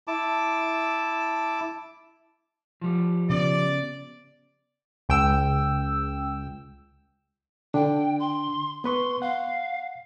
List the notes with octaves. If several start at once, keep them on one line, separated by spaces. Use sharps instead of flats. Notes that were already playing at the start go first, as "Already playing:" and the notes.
E4 A5 D6
F3 G3
C#3 B3 D5
C#2 G5 E6
D3 D4 G5
C6
B3 B4 C6 C#6
F5 F#5